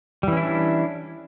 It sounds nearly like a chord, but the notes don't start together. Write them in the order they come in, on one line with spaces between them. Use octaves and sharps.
G3 E3 C#4 E4 D4